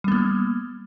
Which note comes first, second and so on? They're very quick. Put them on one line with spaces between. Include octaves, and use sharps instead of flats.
G3 B3 A#3